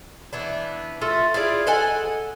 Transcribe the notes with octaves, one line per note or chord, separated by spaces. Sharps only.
E3 B3 D4
A3 F4 A4
E4 F4 G#4 D5
A4 D#5 F#5 G#5